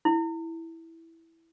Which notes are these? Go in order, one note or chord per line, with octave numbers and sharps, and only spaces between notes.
E4